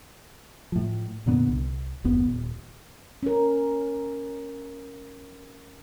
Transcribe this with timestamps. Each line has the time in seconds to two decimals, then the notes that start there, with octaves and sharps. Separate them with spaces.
0.72 A2 F3
1.26 F2 A#2 D3 B3
1.49 C2
2.04 F#1 D#2 B3
2.26 D#1
3.23 C#4 A#4